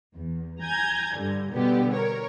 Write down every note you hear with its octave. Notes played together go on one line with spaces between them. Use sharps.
E2
G#5 A#5 G6 G#6
G2 D3 G3
B2 D3 G3 B3 G4
A#4 C#5